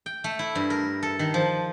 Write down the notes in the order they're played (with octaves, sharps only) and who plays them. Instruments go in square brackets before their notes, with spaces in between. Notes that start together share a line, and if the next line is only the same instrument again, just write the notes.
[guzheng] G5
A3
E4
G2
A#4
A4
D#3
F3